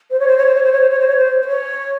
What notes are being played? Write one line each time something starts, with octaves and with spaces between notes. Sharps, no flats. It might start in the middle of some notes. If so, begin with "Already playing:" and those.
C5
C#5
C5
C#5
C5
C#5
C5
C#5
C5
C#5
C5
C#5
C5
C5
C#5